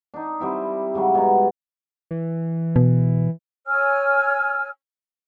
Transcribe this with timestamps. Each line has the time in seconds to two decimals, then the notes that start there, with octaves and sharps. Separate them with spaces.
0.14 D4 D#4
0.40 G3 C4 E4
0.94 G#2 C#3 F#3 G3
1.15 B2 A#5
2.11 E3
2.76 B2
3.67 C#5 G#5 E6 F6